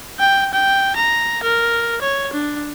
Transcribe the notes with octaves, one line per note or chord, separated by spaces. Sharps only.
G5
G5
A#5
A#4
C#5
D4